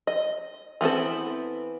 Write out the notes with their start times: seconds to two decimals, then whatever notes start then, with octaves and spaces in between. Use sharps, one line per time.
0.07 D#5
0.81 E3 B3 C4 A4